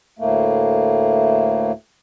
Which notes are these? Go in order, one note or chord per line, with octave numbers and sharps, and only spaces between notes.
D2 A2 A3 A#3